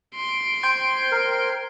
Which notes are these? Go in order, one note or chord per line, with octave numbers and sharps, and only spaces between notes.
C6 D7
C5 G5 G#6
A#4